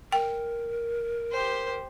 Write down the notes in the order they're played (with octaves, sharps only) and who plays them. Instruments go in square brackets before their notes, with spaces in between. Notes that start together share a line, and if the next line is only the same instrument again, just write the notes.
[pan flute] A#4 [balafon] G5
[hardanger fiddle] G4 C5